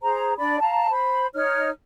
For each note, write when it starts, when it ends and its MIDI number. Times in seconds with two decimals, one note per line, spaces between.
0.02 0.33 68
0.02 0.33 72
0.02 0.33 82
0.38 0.59 62
0.38 0.59 74
0.38 0.59 83
0.61 0.90 77
0.61 0.90 81
0.61 0.90 82
0.90 1.27 72
0.90 1.27 83
1.34 1.69 63
1.34 1.69 73
1.34 1.69 89